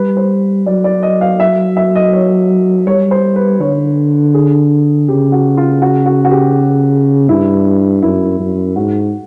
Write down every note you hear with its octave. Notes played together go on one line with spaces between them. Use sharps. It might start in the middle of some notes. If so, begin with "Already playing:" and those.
Already playing: G3 B4
C5
F#3 D5
D5
D#5
F5
E5
E5
D#5
C#5
G3 C#5
C5
B4
D3 C#5
G#4
C#3 G4
F#4
F4
F#4
F#4
F#4
G4
G2 E4
F#2 E4
F#2
G#2 F#4